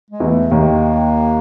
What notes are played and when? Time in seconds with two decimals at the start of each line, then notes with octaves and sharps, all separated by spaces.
0.10 G#3
0.20 E2 E3
0.26 A#3
0.30 A3
0.51 D#2 D#3 A#3